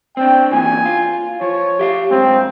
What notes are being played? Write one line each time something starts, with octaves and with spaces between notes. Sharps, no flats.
C4 D4 G5
E2 A#2 E3 G#5
F4
F3 C#5
G4 E5 F5
F2 G#2 C4